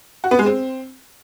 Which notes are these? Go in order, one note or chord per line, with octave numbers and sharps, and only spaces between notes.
F#4
B3
G#3
C4